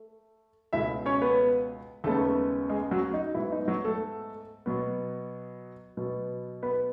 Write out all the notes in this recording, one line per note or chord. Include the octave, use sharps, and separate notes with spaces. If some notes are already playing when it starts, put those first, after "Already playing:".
Already playing: A3
C#2 B2 A3 E4 E5
C#4 C#5
B3 B4
D#2 C#3 G#3 A3 B3 A4
G#3 G#4
F#3 F#4
D#4
G#2 F#3 B3 E4
D#4
F#3 F#4
A3 A4
B2 F#3 B3
B2 F#3 B3
B3 B4